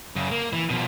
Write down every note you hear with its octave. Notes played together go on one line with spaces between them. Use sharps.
F#2 C#3
A#3
E3
B2 F3